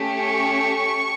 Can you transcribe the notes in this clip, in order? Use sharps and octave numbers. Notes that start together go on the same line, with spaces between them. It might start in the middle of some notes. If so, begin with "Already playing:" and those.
Already playing: A3 C#4 G4
C#6